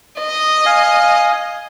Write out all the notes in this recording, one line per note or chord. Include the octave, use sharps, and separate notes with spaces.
D#5
F5 G#5